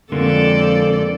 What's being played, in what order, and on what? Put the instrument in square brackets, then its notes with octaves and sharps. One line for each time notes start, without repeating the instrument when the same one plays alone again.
[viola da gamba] F2 A4 D5 [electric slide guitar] D3 G#3 A#3